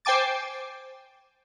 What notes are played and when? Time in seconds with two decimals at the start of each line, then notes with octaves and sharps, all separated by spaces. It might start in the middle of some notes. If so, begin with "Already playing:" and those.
0.05 C5 G5 G#5 D6 A6